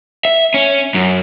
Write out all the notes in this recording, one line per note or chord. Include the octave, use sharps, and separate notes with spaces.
E5
C#4
F#2